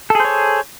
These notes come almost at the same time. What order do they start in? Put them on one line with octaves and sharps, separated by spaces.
A4 G#4 C5 C#5